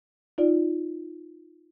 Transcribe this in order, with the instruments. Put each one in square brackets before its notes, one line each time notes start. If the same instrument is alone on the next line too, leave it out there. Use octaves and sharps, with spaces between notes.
[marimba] D#4 F4 D5